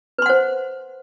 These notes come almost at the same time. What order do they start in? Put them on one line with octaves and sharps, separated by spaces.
B4 C6 F#5 C5